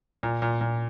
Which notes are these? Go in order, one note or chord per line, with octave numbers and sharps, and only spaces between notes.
A#2
A#2
A#2